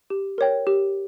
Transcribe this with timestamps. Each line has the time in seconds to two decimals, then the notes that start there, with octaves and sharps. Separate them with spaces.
0.10 G4
0.38 A#4 C#5 G5
0.67 G4